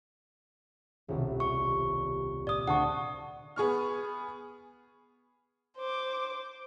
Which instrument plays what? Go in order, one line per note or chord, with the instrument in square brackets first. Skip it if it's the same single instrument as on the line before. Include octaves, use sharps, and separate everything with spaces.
[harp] D#1 C2 B2
[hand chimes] C#6
[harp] A#2 [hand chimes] D5 D#6
[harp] D2 [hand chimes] F#5 A5 C#6
[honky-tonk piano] B3 G#4 C#6 F6
[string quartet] C5 D6